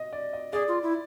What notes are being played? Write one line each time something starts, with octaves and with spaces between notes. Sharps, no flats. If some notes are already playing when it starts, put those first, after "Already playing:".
Already playing: D#5
D5
D#5
G#4 D5
F4
E4